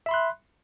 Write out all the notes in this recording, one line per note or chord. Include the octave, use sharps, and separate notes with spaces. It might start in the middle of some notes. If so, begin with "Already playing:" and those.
E5 B5 C6 F#6